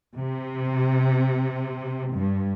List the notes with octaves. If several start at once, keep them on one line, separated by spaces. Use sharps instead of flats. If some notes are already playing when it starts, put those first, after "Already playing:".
C3
G2